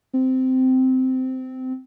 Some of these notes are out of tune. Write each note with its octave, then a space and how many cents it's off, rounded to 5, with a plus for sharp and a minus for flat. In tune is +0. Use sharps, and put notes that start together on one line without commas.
C4 -15